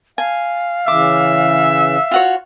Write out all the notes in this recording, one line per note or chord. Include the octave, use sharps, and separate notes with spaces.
F5 G#5
C#3 E3 E5 D6
F4 F#4 C#5